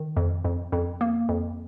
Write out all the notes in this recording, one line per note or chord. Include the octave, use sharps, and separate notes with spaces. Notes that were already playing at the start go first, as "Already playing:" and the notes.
Already playing: D#3
F2
F2
F2
A#3
F2